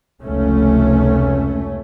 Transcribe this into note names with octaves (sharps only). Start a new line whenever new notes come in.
F1 C#2 A3 C#4